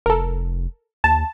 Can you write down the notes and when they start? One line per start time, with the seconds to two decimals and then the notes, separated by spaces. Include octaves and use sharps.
0.06 F1 A4 A#4
1.04 D#2 A5